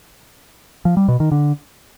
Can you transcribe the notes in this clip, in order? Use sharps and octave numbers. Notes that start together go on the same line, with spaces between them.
F3
G3
B2
D#3
D3